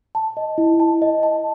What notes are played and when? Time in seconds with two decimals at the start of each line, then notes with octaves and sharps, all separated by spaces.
0.15 A5
0.37 D#5
0.58 E4
0.80 A5
1.02 D#5
1.23 A5